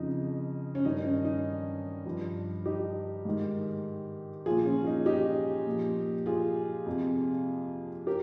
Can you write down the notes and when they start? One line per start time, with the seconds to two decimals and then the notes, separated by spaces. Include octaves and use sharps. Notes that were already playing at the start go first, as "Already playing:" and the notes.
Already playing: F2 C#3 F3 D#4
0.75 C#4
0.85 G2 D#3 D#4
1.05 C#4
1.25 D#4
2.05 G2 F3
2.65 D#4 G4
3.25 G#2 D#3
4.46 A#2 F3 F4 G#4
4.65 C#4 F4
4.86 D#4
5.06 D#4 G4
5.67 A#2 F3
6.26 F4 G#4
6.86 F2 C3 F3
8.07 G4 A#4